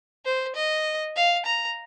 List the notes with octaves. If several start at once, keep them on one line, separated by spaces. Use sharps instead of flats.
C5
D#5
F5
A#5